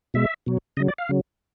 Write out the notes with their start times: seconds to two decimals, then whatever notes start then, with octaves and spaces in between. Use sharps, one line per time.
0.14 B2 G#3 E5
0.46 B2 F#3
0.77 C#3 D#5
0.80 F#3
0.88 D5
0.98 F5
1.09 C#3 F#3